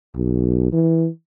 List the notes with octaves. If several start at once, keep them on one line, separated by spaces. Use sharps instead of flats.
B1
E3